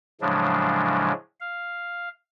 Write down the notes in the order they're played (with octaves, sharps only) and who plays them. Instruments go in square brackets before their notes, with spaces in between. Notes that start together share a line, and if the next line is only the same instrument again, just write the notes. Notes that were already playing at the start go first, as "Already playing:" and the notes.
[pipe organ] A2 C#3 F3 F#3 G#3 D4
F5